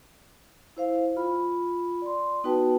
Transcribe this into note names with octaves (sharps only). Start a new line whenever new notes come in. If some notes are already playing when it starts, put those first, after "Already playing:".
E4 C5 F5
F4 B5
D5 C6
B3 D#4 F#4 B4 G5 A5